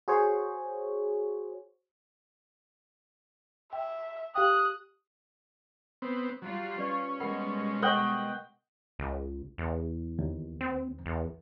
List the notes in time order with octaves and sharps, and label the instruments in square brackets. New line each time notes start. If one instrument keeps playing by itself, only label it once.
[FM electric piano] F#4 G#4 C5 C#5
[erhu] E5 [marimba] G5
[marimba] G4 F5 G5 [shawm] D#6 [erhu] F#6
[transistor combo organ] B3 C4
[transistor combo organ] F#3 [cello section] G3 F4
[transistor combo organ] C#4 [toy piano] B4 D5 C#6
[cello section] B2 G3 G#3 [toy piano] A#4 F#5 B5
[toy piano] A#4 C#6 [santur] D#5 F#5 G5
[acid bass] C#2
E2
[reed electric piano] D#2
[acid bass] C4
E2